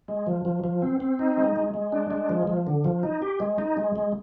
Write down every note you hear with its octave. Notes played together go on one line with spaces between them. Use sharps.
G#3
F3
F3
F3
C4
C4
D#4
G#3
G#3
G#3
D4
G#3
F3
F3
D3
F3
D#4
G4
G#3
D#4
G#3
G#3